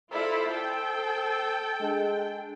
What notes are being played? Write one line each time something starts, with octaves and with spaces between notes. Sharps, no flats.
E4 F4 A4 C5 D5 E6
A4 G5
G#3 D4